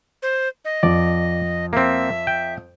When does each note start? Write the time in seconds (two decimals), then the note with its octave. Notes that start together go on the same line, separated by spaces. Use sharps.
0.22 C5
0.65 D#5
0.83 F2 D5
1.73 A#3 C4 E5
2.27 G5